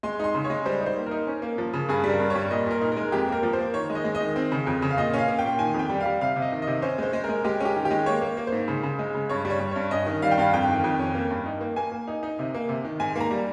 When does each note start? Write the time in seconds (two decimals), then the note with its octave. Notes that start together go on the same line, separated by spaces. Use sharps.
0.03 G#3 C6
0.19 D#4 C6
0.35 C#3
0.44 C#5
0.50 G#3
0.66 G3 C5
0.81 D#4
0.86 C5
0.97 A#3
1.07 D#4 A#4
1.27 C#4
1.42 A#3
1.58 F3
1.73 C#3
1.89 G2 G#4
2.04 G3
2.10 A#4
2.20 G2
2.30 C#5
2.36 G3
2.51 A#2 D#5
2.66 A#2 A#4
2.81 D#4
2.92 G#3 A#4
3.12 F2 G4
3.28 A#3 A#4
3.43 F3
3.53 C5
3.59 A#3
3.74 D#3 C#5
3.90 G#3
3.95 D#5
4.04 G#3
4.15 D#5
4.20 D#3
4.36 C4
4.52 C#3
4.67 F2
4.82 C#3
4.90 F5
4.97 A#2 D#5
5.14 C#4 F5
5.28 A#3
5.39 G5
5.44 A#2
5.59 D#3 G#5
5.74 F2
5.79 G5
5.90 G3
6.00 F5
6.06 G3
6.21 C3 F5
6.36 C3
6.42 D#5
6.52 D#3
6.62 C3 D#5
6.82 C#4 C5
6.98 G#3 C5
7.13 G#3
7.24 A#4
7.29 G#3
7.44 G#3 G4
7.60 C#4 G4
7.76 D#3
7.85 G4
7.90 G#3
8.06 A#3 C#5
8.21 A#3
8.37 A#3
8.47 G#2 C5
8.68 C#3
8.83 C#3
8.99 G#3
9.14 C#3
9.29 G2 C#5
9.45 G3
9.50 C#5
9.60 G3
9.71 G2 C#5
9.91 C#4 D#5
10.06 D#3
10.22 G3 F5
10.31 G5
10.38 G2 F5
10.53 F2 G5
10.69 D#3
10.84 F2
10.99 C#4
11.15 A#3
11.31 G2
11.46 D#4
11.61 A#3
11.76 A#3 G#5
11.92 A#3
12.08 D#4
12.23 D#4
12.39 C3
12.54 A#3
12.69 C3
12.85 D#3
13.00 G#2 G#5
13.16 A#3 A#5
13.30 G3